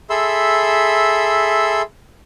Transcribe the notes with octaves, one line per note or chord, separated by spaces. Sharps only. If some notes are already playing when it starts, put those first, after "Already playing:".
G#4 A4 E5 B5 C6 E6